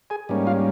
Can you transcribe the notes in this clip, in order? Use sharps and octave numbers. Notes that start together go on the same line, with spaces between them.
G#4 G#5
G#2 G3 A#3 C#4
F4 F5